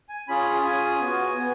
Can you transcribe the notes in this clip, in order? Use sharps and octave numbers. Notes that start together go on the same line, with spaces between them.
G#5
C#4 F4 G#4 B5
C#4 F4 G#4 G#5
B3 F#4
B3